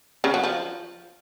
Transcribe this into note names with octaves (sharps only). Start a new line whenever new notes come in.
C#3
F#3
F3